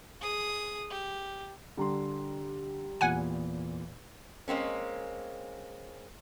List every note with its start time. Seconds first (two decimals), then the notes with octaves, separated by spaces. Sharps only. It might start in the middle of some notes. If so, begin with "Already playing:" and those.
0.21 G#4 D#6
0.90 G4
1.77 D3 G3 A#5 C6
3.01 E2 A#2 F#5 G#5
4.48 G#3 A#3 C4 C#4